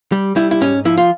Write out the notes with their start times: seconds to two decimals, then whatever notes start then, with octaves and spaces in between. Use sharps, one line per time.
0.12 G3
0.36 G3 E4
0.51 E4
0.61 G#2 C#4
0.85 F3 E4
0.98 F4